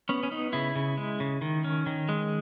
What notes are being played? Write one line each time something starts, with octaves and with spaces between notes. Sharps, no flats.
B3 C#4
C#4
B3 D#4
C#3 E4
C#3
G#3
C#3
D#3
C#4
D#3
G#3